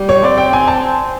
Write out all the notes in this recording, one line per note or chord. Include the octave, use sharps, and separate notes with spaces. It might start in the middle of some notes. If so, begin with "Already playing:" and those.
Already playing: G3
C#5
C4 D5
G5
G#5
A5